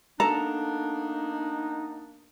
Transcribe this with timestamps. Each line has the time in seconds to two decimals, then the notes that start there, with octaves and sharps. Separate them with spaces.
0.20 A#3 B3 D4 D#4 A4 A#5